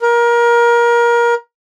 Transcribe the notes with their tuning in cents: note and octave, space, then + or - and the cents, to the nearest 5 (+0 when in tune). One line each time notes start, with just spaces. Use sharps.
A#4 +25